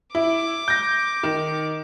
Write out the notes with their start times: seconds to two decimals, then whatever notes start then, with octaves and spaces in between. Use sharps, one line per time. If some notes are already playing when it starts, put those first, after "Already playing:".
0.15 E4 D6
0.68 G6 A#6
1.23 D#3